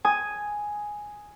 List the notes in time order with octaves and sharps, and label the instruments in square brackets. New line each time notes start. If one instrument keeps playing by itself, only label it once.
[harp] G#5 D#6